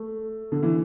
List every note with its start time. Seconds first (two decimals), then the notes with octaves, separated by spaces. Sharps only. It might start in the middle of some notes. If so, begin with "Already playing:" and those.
Already playing: A3
0.52 D3
0.63 E3